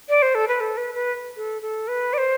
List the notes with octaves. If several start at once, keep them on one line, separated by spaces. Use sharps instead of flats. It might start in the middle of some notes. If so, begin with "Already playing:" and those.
D5
C5
A4
B4
A4
B4
B4
A4
A4
B4
D5
C5